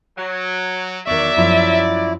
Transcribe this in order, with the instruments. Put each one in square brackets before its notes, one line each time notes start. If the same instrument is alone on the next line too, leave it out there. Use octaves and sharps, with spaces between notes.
[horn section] F#3
[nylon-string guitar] E2 D#3 [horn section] F#3 D5 [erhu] E5 [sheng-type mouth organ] C#6
[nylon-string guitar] F#2 F3 C#5 [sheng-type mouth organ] E4